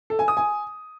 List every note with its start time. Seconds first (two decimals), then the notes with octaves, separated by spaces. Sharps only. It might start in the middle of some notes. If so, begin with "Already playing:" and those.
0.10 A4
0.19 G#5
0.28 D#6
0.37 G#5